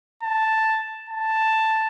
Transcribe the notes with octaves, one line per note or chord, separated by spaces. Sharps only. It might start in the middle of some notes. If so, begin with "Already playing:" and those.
A5
A5